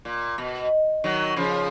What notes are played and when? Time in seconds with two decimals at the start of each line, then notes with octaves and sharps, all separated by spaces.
0.05 A#2
0.38 B2
1.04 D#3 F#3
1.36 C#3 F3